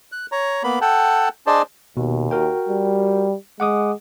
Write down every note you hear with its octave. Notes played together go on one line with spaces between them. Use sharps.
F#6
C#5 A#5
A#3 B3 B5
A4 F#5 G5 A5
D4 G#4 C5 D5 D#5 A5
D#2 B2
F#4 A#4 G5
G3
G#3 F#5 D6 D#6